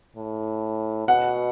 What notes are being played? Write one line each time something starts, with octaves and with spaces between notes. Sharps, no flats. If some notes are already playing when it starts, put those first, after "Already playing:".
A2
B2 F#5